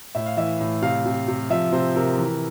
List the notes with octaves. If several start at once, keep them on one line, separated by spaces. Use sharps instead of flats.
A2 E5
F5
E3 E5
A2
C3 F5
C3
C3
F3 E5
C3 C5
C3 A#4
E3